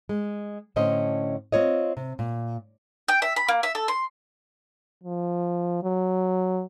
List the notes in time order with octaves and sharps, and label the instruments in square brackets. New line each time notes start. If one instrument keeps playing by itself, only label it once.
[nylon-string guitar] G#3
A2 D3 C#4 C5 D#5
C4 F4 C#5 D#5
C3
A#2
[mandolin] G5
E5
B5
A#3
E5
A4
C6
[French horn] F3
F#3